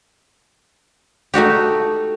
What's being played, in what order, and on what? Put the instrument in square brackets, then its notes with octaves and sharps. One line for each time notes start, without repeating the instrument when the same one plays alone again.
[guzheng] A3 D#4 F#4 G4